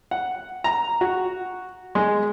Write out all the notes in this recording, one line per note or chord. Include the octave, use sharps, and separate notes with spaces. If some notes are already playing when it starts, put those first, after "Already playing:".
F#5
A#5
F#4
G#3